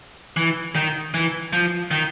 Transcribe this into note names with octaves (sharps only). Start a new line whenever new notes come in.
E3
D#3
E3
F3
D#3